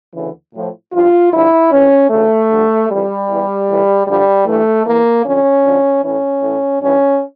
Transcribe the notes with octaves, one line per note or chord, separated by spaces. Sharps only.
D2 C#3 E3
A2 F3
G2 F3 F4
G2 D3 F3 E4
F2 E3 C#4
D2 C#3 E3 A3
G2 D3 F3
F2 E3 G3
E2 E3
A2 E3
G2 D3 F3 G3
G2 E3 A3
E2 E3 A#3
F2 D3 F3 C#4
D2 D3 F3
A2 E3 C#4
A2 E3
G2 E3 C#4